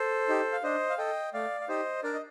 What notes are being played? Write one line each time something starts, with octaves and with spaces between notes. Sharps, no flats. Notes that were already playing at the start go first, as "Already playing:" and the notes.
Already playing: A4 C5
D#4 G4
F5
D4 C5 D#5
F5
A4 D#5 G5
A3 D5 F5
F5
D#4 G4 C5 D#5
D4 A#4 D5
D#5